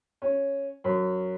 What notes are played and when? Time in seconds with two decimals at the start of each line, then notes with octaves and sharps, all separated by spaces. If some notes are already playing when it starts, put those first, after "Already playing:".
0.22 C#4
0.84 F#2